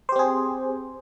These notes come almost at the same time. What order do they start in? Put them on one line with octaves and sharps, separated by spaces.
C5 G4 C4 G#4